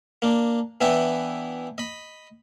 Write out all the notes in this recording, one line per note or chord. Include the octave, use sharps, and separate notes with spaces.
A#3 D4
E3 B3 D4 E4 B4 G5
D#5 B5